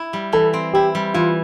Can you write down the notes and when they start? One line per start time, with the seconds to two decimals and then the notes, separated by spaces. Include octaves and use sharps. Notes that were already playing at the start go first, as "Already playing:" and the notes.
Already playing: E4
0.13 G3
0.33 E3 A4
0.54 C4
0.73 E4 G4
0.95 G3
1.14 E3 F4